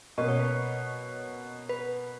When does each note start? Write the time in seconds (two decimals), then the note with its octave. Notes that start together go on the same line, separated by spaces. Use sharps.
0.18 B2 A#3 C#4 D#5
0.28 C#5
0.39 B4
0.49 C#5
1.69 B4